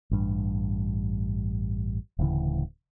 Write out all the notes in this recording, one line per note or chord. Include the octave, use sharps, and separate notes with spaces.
A1 G2
D1 D2 C#3 E3